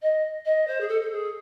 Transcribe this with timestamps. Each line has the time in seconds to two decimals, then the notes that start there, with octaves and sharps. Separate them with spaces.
0.02 D#5
0.45 D#5
0.67 C5
0.80 G#4
0.88 A4
1.01 A4
1.11 G#4